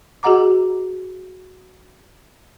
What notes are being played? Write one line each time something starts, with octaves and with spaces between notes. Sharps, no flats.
F#4 G#4 D#5 F#5 A#5 D6